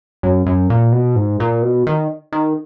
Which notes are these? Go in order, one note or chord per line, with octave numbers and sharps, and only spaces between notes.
F#2
F#2
A#2
B2
G#2
A#2
B2
D#3
D#3